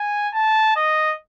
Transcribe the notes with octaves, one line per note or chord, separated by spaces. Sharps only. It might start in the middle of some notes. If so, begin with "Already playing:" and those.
Already playing: G#5
A5
D#5